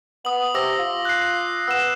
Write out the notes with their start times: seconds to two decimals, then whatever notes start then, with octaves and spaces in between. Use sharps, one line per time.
0.25 B3 D#6 F#7
0.54 C3 D6 E6 A#6
0.79 F4
1.05 F#6 C7
1.68 B3 E6 E7